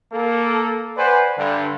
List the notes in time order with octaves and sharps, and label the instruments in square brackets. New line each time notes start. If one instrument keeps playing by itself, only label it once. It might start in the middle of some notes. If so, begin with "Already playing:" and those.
[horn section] A#3 A4
B4 C5 D5 F#5 G#5
G2 D3